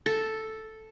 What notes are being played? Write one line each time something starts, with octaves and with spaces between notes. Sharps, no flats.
A4